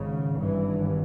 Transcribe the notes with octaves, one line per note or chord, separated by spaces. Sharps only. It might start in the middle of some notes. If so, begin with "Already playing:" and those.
Already playing: G#1 G#2 C#3
G#1 G2 E3